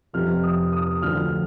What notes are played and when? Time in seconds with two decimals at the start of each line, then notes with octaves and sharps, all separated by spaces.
0.13 F1 F2 C3 F6
0.44 D#6
0.72 D#6
1.02 D2 D3 F3 F6